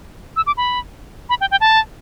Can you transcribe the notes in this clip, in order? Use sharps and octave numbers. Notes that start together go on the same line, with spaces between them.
E6
D6
B5
B5
G5
G5
A5